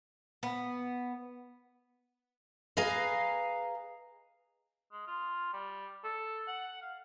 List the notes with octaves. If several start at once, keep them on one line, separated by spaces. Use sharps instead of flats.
B3
G#4 B4 D#5 F5 G#5 A#5
G#3
F4
G3
A4
F#5
F5